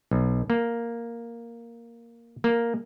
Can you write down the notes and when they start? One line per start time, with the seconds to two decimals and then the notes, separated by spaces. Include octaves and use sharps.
0.11 B1
0.50 A#3
2.44 A#3